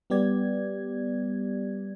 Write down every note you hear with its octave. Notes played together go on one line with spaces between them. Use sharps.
G3 B3 G4 D5 G#6